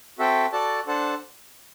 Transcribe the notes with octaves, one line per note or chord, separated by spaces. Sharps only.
C4 F#4 A4 E5 G5
F#4 A4 D5 A5
D4 A4 C5 F#5 A5